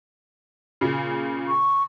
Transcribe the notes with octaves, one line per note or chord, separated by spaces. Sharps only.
A#2 C#3
C#6